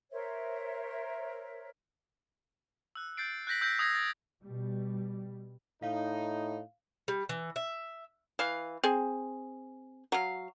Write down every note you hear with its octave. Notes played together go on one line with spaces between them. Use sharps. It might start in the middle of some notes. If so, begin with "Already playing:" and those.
A#4 C5 C#5 E5
E6 F#6
G6 A6 C7 D7
F#6 G6 A#6 B6 F#7
E6 G6 A#6 B6 D7
D#6 E6 G#6 A#6 C7
A6
B2 G3
A2 D#4 F5
G3
E3
E5
E3 F5
C4 G#4
F#3 F5